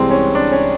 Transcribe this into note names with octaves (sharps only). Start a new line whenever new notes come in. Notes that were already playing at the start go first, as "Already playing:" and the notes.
Already playing: C2 C3 E3 G#3 C4
C#4
D4
C#4